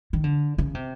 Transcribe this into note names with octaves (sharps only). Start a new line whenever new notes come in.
D#3
D3
C#3
C3